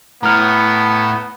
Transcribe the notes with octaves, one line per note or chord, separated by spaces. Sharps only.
A2 B3 A#5 F6